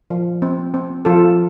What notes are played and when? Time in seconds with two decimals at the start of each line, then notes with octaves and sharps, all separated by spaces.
0.10 F3
0.42 C4
0.74 C4
1.05 F3 F4 A4